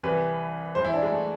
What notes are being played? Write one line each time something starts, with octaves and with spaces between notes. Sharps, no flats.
C2 C3 E3 B4
G#2 E3 C5
E4
D4
G#3
A3